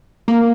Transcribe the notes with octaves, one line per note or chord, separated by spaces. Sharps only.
A#3